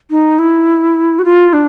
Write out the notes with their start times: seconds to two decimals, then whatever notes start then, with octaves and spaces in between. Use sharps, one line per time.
0.10 D#4
0.38 E4
1.18 F#4
1.24 F4
1.53 D4